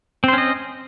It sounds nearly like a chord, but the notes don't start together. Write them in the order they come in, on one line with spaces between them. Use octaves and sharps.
C4 C5 C#4 D#5